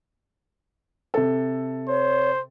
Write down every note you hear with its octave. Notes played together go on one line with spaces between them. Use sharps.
C3 A4
C5 C#5